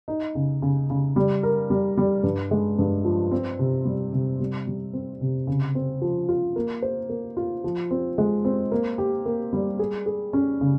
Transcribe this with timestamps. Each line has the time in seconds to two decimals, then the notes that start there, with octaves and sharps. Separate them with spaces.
0.08 D#4
0.35 C#3
0.62 C#3
0.90 C#3
1.16 G3
1.43 A#4
1.70 G3
1.98 G3
2.23 G2
2.51 G#3
2.79 G2
3.05 F3
3.31 C4
3.59 C3
3.85 G3
4.13 C3
4.40 G3
4.67 G3
4.93 C4
5.21 C3
5.47 C#3
5.75 C4
6.02 F3
6.29 F4
6.56 A#3
6.82 C5
7.09 A#3
7.37 F4
7.64 F3
7.91 C4
8.18 G#3
8.45 C4
8.72 A#3
8.98 G4
9.26 A#3
9.53 G3
9.79 G#4
10.06 G#4
10.33 C#4
10.61 C#3